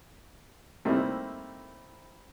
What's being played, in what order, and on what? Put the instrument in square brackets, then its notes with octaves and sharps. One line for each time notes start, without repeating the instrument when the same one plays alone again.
[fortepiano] G3 A3 A#3 C4 D#4 E4